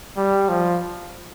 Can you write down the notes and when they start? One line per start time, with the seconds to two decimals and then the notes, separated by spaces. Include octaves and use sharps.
0.17 G3
0.49 F3